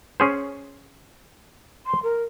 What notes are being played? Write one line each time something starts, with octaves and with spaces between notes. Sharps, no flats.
C#4 G#4 C5
C6
A#4